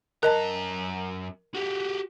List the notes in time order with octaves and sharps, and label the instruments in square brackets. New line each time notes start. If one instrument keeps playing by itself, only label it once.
[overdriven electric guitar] F#2 A#5 [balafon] A#4 D#5 A5
[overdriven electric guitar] F#4 G4